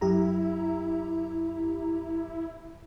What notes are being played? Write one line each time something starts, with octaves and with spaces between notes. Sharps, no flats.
F#2 E4 G4 A#5